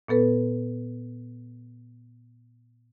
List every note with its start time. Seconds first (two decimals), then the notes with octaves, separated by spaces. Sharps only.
0.08 A#2 B3 A4 B4